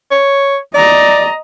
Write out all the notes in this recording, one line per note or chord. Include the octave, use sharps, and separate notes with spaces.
C#5
D5 D#5 A#5